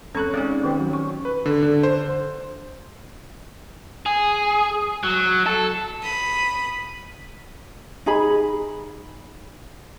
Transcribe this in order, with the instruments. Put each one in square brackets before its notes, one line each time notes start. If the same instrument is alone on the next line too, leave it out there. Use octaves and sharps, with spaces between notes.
[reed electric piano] E2 C#6 F#6 [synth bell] G#3 C#5 [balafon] C4 C#4 A4
[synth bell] C4 C#4 D#4 [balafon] G#4 [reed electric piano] D5
[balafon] D#3 G5 [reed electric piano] B3 G4 C5
[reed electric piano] F#3
[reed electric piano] C#4 [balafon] C#6
[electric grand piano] B4
D3
D3
C5
[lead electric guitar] G#4
F#3
A4
[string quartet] B5 D#6
[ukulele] D#4 G#4 B5